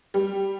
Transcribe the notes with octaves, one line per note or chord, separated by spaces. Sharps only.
G3